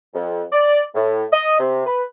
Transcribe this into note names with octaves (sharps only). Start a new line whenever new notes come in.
F2
D5
A2
D#5
C3
B4